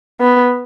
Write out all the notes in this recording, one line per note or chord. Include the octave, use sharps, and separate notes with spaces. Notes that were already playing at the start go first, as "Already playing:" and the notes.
B3